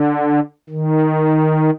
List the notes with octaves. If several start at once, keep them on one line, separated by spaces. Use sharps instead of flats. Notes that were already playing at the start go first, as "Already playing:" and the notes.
Already playing: D3
D#3